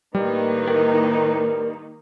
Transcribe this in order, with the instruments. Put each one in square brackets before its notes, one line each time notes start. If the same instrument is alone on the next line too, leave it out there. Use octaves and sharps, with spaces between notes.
[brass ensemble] A2 B4 [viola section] D#3 A#3 D#4 [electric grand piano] G3
[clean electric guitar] A#4 G5